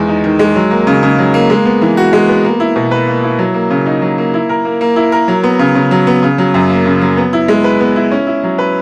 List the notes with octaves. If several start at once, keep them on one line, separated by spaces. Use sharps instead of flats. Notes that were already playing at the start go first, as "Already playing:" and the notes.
Already playing: E2 D#3 G#3
D#4
D#3
G#3
F#3
A#3
C#3
C#3
F#3
A#3
G#3
B3
E3
F#4
G#3
B3
A#3
E4
B2
B4
A#3
E4
F#3
A#3
C#3
D#4
F#3
A#3
E4
A#4
A#3
A#3
E4
A#4
F#3
B3
C#3
C#3
F#3
B3
C#3
F#3
F#2
A#3
C#3
F#3
B3
E4
G#3
B4
B3
E4
C#4
E4
F#3
B4